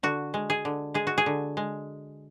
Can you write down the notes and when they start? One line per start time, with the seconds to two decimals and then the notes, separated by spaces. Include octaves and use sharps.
0.03 D3 F#4
0.34 G#3
0.50 G#4
0.65 D3
0.94 G#3 G#4
1.07 F#4
1.18 G#4
1.26 D3
1.57 G#3